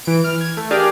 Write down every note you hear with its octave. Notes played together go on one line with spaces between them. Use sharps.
E3 D7
F6
G#6
A3
D4 G4 G#4 A#4 D5 F5